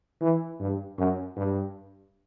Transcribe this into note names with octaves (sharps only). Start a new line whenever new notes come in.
E3
G2
F#2
G2